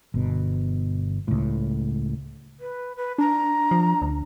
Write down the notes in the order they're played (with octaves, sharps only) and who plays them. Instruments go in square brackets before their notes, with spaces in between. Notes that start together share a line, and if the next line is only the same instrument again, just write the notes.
[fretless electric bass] G1 B2
C#2 A2
[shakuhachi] B4
B4
[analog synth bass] D4 [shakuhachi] A#5
[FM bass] F3
D2